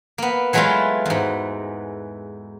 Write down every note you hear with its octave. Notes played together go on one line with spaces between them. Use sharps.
A#3 B3
E3 F#3 G#3 A3 E4 F4
E2 G#2